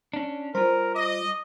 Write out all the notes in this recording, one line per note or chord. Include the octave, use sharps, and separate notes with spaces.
C#4 D4
G3 F4 A#4 C5
D#5 D6